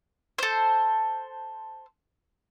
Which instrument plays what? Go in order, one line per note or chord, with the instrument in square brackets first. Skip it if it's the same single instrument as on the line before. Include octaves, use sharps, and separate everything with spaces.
[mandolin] A4 C5